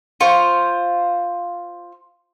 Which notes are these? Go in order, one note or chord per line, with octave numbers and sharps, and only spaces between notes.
F4 C5 C#6